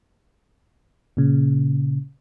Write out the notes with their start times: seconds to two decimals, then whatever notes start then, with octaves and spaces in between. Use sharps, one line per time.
1.17 A#2 C#3